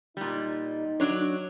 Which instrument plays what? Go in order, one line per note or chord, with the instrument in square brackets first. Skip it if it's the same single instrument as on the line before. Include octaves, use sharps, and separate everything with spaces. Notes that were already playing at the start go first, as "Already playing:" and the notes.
[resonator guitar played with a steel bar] A#2 G3 [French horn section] D#4
[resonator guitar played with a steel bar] F#3 D4 C#5